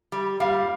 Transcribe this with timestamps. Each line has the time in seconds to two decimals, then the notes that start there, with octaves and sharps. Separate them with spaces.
0.12 G3
0.40 G3 F5